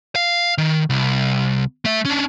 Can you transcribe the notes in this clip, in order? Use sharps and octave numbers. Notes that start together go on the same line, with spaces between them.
F5
D#3
C2
A3 E5
C#4 D4